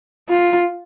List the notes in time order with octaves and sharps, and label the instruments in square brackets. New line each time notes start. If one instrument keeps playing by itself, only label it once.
[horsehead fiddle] F4